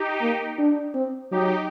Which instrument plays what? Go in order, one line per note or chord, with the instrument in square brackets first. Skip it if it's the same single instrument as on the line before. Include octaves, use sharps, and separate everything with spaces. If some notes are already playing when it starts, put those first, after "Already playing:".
Already playing: [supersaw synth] D#4 G4
[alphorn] A#3
D4
C4
[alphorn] F#3 [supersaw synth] D#4 G4